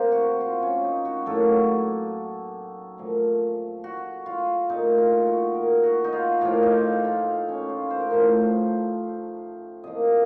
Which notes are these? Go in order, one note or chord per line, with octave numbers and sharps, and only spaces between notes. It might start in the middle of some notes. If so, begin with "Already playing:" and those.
Already playing: C3 A#3 A#4 C5
F#4
F4
C#4
D#4
F#4
A2 F#3 A#3 A4
A#2 F3 A3
F#4
F4
A#2 A3 D#4
F4
F#4
A#4
F#4
D#4
F4
A2 F3 A#3 F4
D#4
D#4
F4
C#4
F4
C5
A#4
A2 F3 A3 C5
C3 F3 A#3 D#5